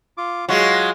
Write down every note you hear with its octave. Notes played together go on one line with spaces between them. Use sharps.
F4 D6
F#3 G#3 F4 F#4